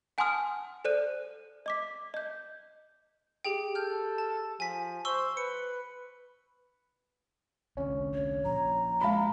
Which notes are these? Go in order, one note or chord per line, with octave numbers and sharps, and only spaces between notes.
F#5 G#5 A5 C6 D#6 F6
A4 C5 D5 F#6 D#7
D#5 D6 B6
D#5 G6
G4 G#4 G5
A4 F6 G6
A5
F3 G#5 B6
C5 C#6 E6 G7
B4 C#7
C2 D3 C#4
C#5
A#2 F3 A#5
G#3 F5 A5 B5